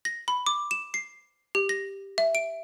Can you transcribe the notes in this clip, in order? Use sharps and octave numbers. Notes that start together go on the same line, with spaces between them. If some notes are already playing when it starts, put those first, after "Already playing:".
A#6
B5
D6
E7
C7
G4
A#6
E5
D7